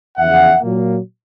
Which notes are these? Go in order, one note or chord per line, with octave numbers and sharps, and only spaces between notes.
E2 C#3 F3 E5 F#5
A#2 F#3 A#3